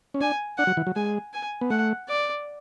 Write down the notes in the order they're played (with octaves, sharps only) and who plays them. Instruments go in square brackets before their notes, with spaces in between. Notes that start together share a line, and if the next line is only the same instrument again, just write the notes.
[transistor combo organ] C#4
[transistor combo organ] D4 [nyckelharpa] G#5
[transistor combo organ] D4 [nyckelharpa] F#5
[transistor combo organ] F#3
E3
F#3
[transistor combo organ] G#3 [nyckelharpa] G#5
[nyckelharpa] G#5
[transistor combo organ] B3
[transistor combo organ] A3 [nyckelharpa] F#5
[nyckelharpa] D5